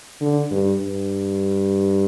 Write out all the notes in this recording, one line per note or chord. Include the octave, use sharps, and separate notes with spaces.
D3
G2
G2